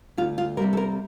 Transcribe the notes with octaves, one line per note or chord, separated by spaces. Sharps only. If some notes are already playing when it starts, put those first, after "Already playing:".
D2 F4
F4
C3 G3 A#3 A#4
A4
A#4